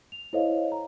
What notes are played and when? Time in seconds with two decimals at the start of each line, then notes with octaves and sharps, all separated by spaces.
0.12 F7
0.33 E4 A4 C5 C#5 D#5 F5
0.72 A#5